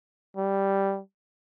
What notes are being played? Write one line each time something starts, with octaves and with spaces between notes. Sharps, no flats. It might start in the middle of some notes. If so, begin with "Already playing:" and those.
G3